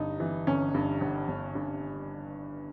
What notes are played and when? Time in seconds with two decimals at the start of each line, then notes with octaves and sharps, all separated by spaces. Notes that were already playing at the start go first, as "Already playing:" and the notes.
Already playing: G1 G2 D#4
0.20 E3
0.47 G1 C#4
0.74 G2
1.01 G1
1.28 G1
1.55 G2